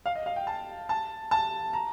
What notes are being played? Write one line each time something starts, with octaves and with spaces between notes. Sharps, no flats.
F5
D#5
F5
G5
A5
A5
A5
A#5